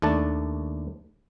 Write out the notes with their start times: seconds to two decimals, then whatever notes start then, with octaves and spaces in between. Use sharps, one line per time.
0.02 D#2 A3 D4 A5